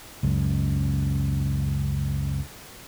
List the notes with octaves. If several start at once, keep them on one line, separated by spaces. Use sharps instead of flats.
C#2 F#2